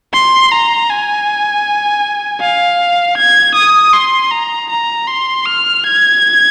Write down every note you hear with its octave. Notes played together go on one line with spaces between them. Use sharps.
C6
A#5
G#5
F5
G#6
D#6
C6
A#5
A#5
C6
F6
G#6